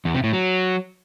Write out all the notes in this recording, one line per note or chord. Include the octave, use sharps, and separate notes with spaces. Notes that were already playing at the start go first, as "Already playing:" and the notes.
E2
C3
A2
F#3